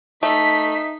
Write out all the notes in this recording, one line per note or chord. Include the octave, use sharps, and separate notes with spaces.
A3 D#4 B6